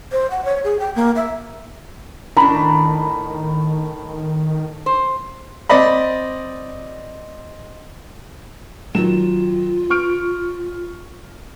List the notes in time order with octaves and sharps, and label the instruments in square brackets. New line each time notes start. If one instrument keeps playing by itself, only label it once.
[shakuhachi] C5
F#5
C#5
G#4
G5
A#3
E5
[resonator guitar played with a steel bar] A2 D4 [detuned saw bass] D#3 [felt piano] A#5 B5
[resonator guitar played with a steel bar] C5
[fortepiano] C4 D5 D#5 B5
[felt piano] D#3 F#3 E7 [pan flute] F4
[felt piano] C#6 F6 D7